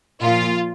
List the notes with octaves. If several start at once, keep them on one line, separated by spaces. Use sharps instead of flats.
A#2 F3 F4